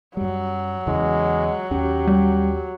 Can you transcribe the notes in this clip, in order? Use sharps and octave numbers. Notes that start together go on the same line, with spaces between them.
F#2 F#3 G3
E2 C#3 E3 G#3
D#2 C#4 G4
G3